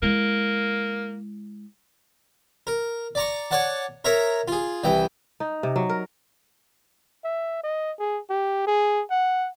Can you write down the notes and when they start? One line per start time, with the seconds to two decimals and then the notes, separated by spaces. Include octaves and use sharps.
0.02 G#3 A#3 E4
2.67 A#4
3.15 D5 A#5 C#6
3.51 C#5 D5 F#5 A5
4.05 A#4 C#5 E5 A#5
4.48 F4 G#4
4.84 C2 E3 G5
5.40 D#4
5.63 C3
5.76 F#3
5.89 A#4
7.24 E5
7.63 D#5
7.99 G#4
8.30 G4
8.67 G#4
9.10 F#5